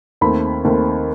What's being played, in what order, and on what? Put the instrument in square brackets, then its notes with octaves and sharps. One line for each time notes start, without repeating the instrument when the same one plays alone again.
[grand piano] D#2 D#3 A3 C4 B5
D#2 D#3 A3 C4